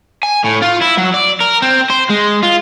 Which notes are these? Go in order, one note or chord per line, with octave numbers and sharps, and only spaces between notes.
G#5
A2
F4
E4
F#3
D5
A#4
C4
C5
G#3
F4